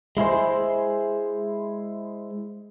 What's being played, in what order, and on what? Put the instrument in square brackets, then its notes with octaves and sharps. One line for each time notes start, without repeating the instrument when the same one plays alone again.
[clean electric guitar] G#3 E4 G#4 C5